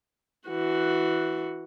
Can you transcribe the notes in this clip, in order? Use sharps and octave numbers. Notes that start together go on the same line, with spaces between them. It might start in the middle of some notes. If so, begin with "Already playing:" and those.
E3 F#4